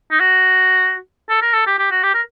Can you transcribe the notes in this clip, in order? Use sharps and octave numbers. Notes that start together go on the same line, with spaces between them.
D#4
F#4
A4
A#4
A4
G4
G4
F#4
G4
A#4